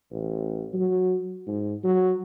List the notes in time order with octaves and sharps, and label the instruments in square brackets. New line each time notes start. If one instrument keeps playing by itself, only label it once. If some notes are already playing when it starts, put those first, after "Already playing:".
[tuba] A1
F#3
G#2
F#3